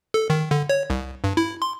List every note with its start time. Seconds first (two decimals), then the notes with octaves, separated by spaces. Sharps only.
0.14 A4
0.30 D#3
0.51 D3
0.69 C#5
0.90 C2
1.24 G2
1.37 E4
1.62 C6